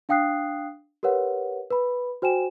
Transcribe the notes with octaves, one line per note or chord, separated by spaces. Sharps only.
D4 F5 G5 D#6 F#6 C7
G4 A#4 B4 C#5 F#5
B4 B5
F#4 C5 G5 G#5 E7